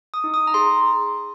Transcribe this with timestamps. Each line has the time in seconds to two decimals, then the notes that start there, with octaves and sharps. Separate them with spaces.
0.14 D#6
0.24 D#4
0.34 D#6
0.47 A#5
0.54 G#4 C6